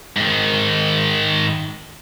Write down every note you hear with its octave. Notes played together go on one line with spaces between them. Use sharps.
G#2 D#3